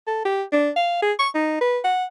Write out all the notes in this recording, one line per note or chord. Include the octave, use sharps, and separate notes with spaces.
A4
G4
D4
F5
G#4
C#6
D#4
B4
F#5